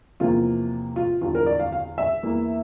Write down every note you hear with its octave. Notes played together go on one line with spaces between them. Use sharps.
E2 C3 F3 A#3 F4
F4
E2 D3 G3 F4
A#4
D5
F5
F5
E5
E2 E3 A#3 E4